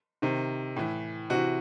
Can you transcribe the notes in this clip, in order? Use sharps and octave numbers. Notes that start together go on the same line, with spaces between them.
C3 D#3
A2 E3
C3 E3 F#4